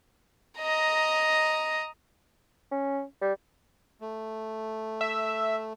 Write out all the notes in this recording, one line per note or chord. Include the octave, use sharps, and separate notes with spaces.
D#5 A#5
C#4
G3
A3
E5